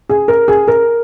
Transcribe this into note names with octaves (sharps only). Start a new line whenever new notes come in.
G#4
A#4
G#4
A#4